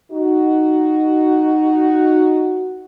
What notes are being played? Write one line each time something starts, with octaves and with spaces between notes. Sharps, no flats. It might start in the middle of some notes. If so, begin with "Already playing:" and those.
D#4 F#4